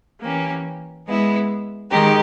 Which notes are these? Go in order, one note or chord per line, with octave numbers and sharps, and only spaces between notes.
E3 A#3 C#4 G4
G#3 B3 E4
D#3 G#3 D#4 G4